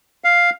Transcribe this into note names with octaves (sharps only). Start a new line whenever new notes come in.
F5